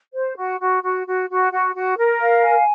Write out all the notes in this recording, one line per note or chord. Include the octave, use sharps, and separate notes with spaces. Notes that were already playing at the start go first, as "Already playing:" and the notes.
C5
F#4
F#4
F#4
F#4
F#4
F#4
F#4
A#4
F5
G#5